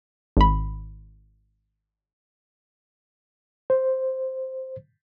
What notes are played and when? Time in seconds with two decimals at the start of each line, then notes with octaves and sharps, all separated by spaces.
0.37 G#1 B5
3.70 C5